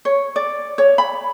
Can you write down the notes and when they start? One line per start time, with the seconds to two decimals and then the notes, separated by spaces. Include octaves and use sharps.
0.05 C#5
0.36 D5
0.78 C#5
0.98 B5